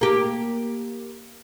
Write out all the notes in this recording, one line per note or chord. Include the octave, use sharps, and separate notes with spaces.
A#3 G4